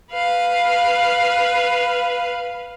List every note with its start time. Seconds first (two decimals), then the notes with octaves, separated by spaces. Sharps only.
0.12 B4 F5